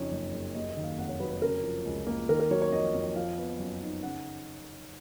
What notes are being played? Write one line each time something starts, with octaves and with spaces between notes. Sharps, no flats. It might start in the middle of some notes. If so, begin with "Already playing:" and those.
Already playing: F2 C#3 D#4 C#5
F#1
F#1
D#2 D#5
D#5
D#3
F5
F1 F#5
C#5
F#3 B4
B4
C#3 A#4
F3
C#2
A#3
D#3 A#4
A#4
F#3 C#5
C#5
F2 D#5
F2
F3 F5
B3
F#2
D#4
C#3 F#5